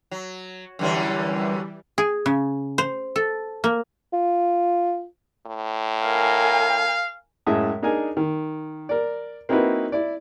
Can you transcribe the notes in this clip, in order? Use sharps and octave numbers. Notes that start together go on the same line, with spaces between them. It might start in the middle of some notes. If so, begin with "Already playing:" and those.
F#3
F#2 D3 E3 G3 C#4
G#4
C#3
C5
A4
A#3
F4
A2
A#4 F5 G#5
F#2 A2 G#3 E5 A5 D#6
D4 D#4 G#4 A#4 G#5
D#3
A#4 D5
A#3 C4 D#4 E4 F#4 B4
E4 D5